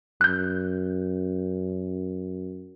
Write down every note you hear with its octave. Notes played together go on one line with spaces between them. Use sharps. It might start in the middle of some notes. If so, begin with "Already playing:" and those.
F#2 F#6 G6